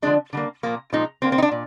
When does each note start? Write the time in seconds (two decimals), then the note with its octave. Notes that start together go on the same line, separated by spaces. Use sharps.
0.02 D3 F3 G#3 D4
0.33 D3 G3 A#3
0.63 A#2 F3 A#3
0.93 A#2 F3 G#3 D#4
1.22 D3 G3 A#3 C4
1.32 C4
1.38 D#4
1.42 D4
1.52 A#2